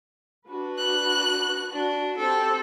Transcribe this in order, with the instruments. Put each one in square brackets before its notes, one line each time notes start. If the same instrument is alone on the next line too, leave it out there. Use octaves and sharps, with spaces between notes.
[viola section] D4 F#4 B4
[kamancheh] F#6
[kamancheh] D4 [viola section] F#4
[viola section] C4 G4 [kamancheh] A4